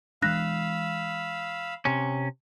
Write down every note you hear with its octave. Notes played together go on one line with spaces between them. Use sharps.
E3 G#3 D4 F5 B5 E6 F#6 A#6
C3 C#4